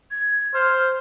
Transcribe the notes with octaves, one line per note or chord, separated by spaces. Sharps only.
G#6
C5 F6